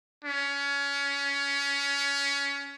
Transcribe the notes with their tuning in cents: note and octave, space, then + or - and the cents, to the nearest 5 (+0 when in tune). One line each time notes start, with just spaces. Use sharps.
C#4 +25